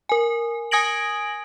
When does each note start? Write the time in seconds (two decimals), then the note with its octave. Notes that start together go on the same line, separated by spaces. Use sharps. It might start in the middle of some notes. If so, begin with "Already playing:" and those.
0.09 A#4 G#5
0.71 G#5 D#6 G#6 A#6 D7 F#7